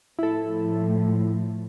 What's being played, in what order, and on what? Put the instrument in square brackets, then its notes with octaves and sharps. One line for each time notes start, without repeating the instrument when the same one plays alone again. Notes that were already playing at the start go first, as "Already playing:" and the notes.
[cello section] A2 F3 [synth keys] E4 A4